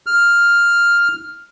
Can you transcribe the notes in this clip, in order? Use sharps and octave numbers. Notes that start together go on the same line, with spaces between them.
F6